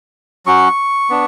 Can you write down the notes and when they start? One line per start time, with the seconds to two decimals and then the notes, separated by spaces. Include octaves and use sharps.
0.46 F#3 C#4 F#4 C#6
1.10 B3 D4